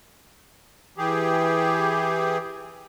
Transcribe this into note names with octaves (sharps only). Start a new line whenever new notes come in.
E3 G4 G#4